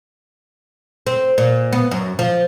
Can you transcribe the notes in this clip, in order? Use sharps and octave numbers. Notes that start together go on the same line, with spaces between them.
C4
A#2
B3
F#2
F3